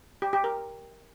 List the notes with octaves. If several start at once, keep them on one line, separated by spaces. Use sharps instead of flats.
G4
G4
A#4